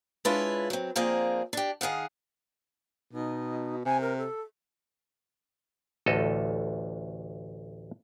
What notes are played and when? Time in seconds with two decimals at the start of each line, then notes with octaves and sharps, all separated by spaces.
0.25 G#3 D4 E4 F4 B4 C#5
0.70 F#3 C4
0.96 F3 A#3 C4 D4 G#4 A#4
1.53 D4 G4
1.81 D#3 G#4 F5 F#5
3.12 B2 D#4
3.85 C3 G#5
4.01 A#4
4.18 A4
6.06 A1 D2 A4 D#5